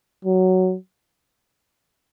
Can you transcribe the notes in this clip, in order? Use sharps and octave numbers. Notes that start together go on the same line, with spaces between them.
F#3